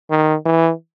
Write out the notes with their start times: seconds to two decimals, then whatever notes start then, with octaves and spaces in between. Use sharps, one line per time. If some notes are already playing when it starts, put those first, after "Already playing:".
0.10 D#3
0.46 E3